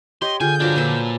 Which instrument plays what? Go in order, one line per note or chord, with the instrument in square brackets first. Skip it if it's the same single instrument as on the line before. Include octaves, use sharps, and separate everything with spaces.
[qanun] G4 C#5 [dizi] D#5 [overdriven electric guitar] C6
[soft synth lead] D3 [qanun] F4 G#4 G5 [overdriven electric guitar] G#5 [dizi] G6
[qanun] F3 F#3 F4 [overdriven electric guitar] D4 G4
[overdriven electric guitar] A#2 [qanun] A4 B4